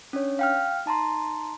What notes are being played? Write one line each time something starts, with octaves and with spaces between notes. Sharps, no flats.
C#4 D4 C#5
F5 G5 F6
D#4 A5 A#5 C6